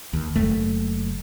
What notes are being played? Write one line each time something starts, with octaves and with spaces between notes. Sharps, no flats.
D#2
F#1 A3